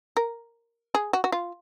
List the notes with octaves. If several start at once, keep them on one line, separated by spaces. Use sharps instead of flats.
A#4
G#4
F#4
F#4
F4